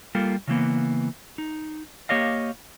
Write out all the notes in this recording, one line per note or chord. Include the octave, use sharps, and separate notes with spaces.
G3 A#3 F4 A4
C#3 E3 A#3 B3
D#4
A#3 G4 C#5 D#5 F5